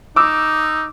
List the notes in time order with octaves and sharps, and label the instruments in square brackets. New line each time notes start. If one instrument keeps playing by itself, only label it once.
[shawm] D#4 [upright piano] D6 E6